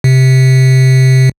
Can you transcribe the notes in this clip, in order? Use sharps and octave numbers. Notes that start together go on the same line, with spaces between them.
C3